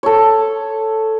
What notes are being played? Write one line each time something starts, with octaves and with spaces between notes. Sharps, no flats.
A4 C#5